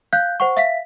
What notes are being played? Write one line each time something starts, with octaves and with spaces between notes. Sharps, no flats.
F5 F#6 G6
C5 F#5 C#6
E5 F5 B6